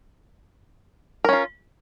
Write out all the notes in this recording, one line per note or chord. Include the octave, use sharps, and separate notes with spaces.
C#4 F4 A#4